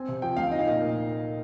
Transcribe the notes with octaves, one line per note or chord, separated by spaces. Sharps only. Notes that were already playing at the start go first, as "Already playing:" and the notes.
Already playing: C4 G#5
C3
F3 G5
D2 F5
D#4 D#5
F5
A#2 D#5
A#2